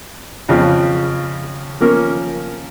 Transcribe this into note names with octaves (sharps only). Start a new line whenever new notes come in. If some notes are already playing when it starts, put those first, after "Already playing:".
F2 C#3 F3
F3 A#3 C#4 A#4